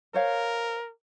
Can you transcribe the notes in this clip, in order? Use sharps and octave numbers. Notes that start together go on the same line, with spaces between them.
A#4 C5 C#5 F5